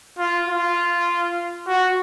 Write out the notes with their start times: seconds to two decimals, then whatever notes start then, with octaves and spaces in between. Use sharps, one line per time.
0.19 F4
0.48 F4
1.68 F#4